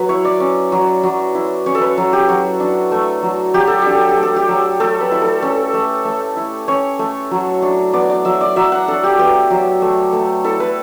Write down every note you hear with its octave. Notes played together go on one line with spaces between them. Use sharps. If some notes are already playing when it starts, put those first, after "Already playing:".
Already playing: F#3 B4
E4 C#5
D5
C#4
F#3
F#3
E4
C#4 C#5
A4
B4
F#3
G4
F#3 F#4
D4
A3
F#3
F#3 G4
A4
D4 G4
A4
G4
A3
A4
G4
F#3
A3 A4
B4
E4
A4
C#4 A4
A3
A3
E4
C#4 C#5
A3
F#3
D4
B3 D5
D5
F#3 E5
D5
F#3 E5
F#5
D4 A4
G4
B3 G4
F#3
A3
A3
E4 A4
B4